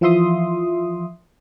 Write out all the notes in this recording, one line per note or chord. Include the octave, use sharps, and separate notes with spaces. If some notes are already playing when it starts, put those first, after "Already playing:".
E3 F3 F4 E5 C6 D#6